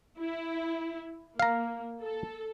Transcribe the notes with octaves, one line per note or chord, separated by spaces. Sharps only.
E4
A#3 F5 A#5
A4